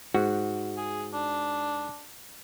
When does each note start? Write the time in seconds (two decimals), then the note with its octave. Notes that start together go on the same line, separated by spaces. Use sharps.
0.14 G#2 F#4
0.77 G#4
1.14 D4